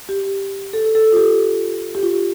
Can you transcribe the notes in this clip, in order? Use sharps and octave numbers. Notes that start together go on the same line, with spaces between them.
G4
A4
A4
F4
G4
G4
F4